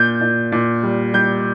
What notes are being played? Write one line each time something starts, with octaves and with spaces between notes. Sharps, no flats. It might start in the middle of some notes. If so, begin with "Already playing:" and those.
Already playing: A#2 G6
A#2
A#2
G3
G3 G6